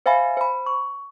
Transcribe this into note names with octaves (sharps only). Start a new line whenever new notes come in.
C5 E5 F5 G#5 B5
C5 B5
C#6